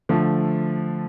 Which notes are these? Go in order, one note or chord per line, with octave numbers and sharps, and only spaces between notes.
D3 F3 A3